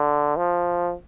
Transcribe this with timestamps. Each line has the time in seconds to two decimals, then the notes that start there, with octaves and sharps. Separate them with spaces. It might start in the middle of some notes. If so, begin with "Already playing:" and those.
Already playing: D3
0.36 F3